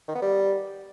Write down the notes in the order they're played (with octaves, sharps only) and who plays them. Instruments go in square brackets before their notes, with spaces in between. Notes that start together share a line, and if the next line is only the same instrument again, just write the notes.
[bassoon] D#3
B3
G3